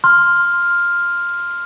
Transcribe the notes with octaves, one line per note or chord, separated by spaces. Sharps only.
C6 F6